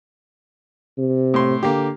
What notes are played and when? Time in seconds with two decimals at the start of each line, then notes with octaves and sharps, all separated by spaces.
0.98 C3
1.34 A2 C6
1.63 D3 A#3 G4